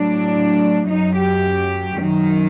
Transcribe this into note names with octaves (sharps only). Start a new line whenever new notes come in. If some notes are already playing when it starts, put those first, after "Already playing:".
Already playing: A2 F#3 D4
F#2 F#3 D#4
G4
F#2 D#3 F#3